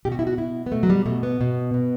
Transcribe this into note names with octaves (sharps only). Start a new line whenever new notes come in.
B2 G4
F#4
E4
F#4
B2 E4
B3
B2 A3
F#3
G3
B2 A3
B3
B2
B2